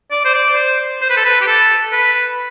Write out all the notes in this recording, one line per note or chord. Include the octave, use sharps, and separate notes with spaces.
D5
C5
D5
C5
C5
B4
A4
B4
G4
A4
B4